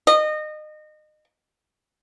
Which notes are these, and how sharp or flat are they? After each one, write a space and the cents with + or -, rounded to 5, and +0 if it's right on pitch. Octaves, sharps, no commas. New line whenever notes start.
D#5 -25